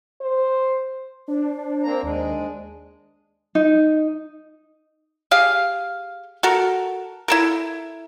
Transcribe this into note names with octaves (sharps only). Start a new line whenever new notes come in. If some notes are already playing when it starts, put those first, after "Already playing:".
C5
D4 C5
D4
A#3 C4 A#5
D#2 G#3 D4
D#4
G4 G#4 F5
F#4 A4 A#4
E4 A4 A#4